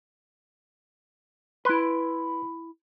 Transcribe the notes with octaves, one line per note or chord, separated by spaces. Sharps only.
E4 B4 C6